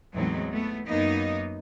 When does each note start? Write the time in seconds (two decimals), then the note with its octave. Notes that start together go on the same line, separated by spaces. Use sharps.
0.15 E2 A2 F#3 G#3 C4 D#4
0.51 A3 B3
0.88 F#2 A#3 B3 D#4 D#5